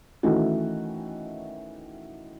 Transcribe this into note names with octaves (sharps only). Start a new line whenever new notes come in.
D#3 E3 A3 C#4 F#4